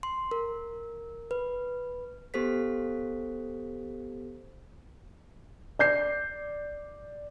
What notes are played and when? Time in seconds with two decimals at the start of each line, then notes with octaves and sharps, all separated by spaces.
0.03 C6
0.31 A#4
1.31 B4
2.34 B3 G4 A4 C5 B6
5.79 D5 G6 C7